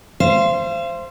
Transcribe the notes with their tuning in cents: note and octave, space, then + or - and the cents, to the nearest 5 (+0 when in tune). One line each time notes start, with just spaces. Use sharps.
C5 +0 F5 -40